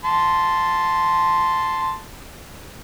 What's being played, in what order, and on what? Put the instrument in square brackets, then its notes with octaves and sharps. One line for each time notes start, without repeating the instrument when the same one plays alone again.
[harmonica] A5 C6